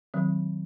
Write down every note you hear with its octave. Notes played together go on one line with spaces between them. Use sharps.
D#3 F#3 C4